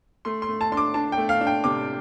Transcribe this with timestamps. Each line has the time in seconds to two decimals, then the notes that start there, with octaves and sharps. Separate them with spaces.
0.25 A3 C6
0.42 C6
0.48 A3
0.61 A5
0.72 D4 C6
0.77 D6
0.94 D4 A5
1.12 G5
1.17 A3
1.29 F5
1.41 D4
1.47 G5
1.64 C3 D6